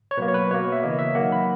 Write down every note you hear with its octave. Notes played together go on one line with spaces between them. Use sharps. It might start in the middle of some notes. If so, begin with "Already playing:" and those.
C#5
B2 F#3 A#3 B4
C#5
B4
B2 A#3 C#5
E5
C#3 E3 A#3 D#5
E5
D#3 F#3 A#3 F#5
B5